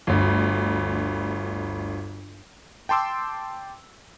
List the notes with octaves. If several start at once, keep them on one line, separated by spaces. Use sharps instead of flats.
G1 D2
G5 A5 C6 D6 E6